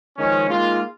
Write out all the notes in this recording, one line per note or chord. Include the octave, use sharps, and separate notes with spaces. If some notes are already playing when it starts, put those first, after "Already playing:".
D#3 F3 G#3 C#4
G#3 A#3 D#4 F4